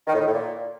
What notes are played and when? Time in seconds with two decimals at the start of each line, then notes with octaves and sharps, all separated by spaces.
0.07 D#3
0.13 A2
0.20 D#3
0.26 A2
0.33 A#2